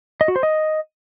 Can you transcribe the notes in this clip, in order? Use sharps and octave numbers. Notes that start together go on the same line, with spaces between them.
D#5
F#4
C5
D#5